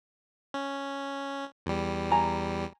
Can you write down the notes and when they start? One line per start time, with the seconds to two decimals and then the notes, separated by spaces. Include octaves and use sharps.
0.54 C#4
1.66 E2 G3
2.11 G#5 A#5